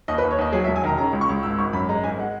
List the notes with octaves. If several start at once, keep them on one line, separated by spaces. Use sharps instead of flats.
D#2 D#5
B4
D#2
C#5
D#2 D#5
F#3 G#4
E5
E1
G#5
D#3 A#5
C#3 A#5
C#2
C#6
C#2
G#1 E6
G#1 C#6
F#2 B5
G#3 A#5
G#1 G#5
G#3 F#5